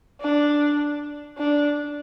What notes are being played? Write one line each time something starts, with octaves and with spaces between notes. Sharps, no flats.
D4
D4